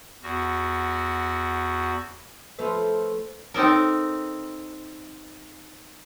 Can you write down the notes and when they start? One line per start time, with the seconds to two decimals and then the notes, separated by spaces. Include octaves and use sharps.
0.23 E2 F#4
2.59 F3 A3 B4
3.54 C4 D#4 A4 A#4